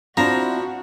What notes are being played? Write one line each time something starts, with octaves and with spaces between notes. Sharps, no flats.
F3 C4 D4 E4 F#4 A#5